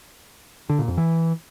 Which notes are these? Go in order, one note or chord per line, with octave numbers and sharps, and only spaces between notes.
D3
A#2
F2
E3